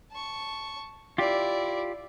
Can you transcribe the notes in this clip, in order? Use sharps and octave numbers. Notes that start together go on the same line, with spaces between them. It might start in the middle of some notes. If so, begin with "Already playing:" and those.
A5 C#6
E4 F4 G4 D5